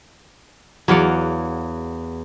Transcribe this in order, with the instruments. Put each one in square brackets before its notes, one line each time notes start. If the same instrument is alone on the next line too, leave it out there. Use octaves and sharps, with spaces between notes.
[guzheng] E2 F5 F#5 [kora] F#3 D5